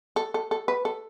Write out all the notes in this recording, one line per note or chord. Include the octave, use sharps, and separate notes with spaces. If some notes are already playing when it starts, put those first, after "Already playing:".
A4
A4
A4
B4
A4